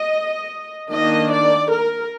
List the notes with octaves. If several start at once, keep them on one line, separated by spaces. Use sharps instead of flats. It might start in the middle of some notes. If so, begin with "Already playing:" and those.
Already playing: D#5
D#3 A#3 D4 D#5
D5
A#4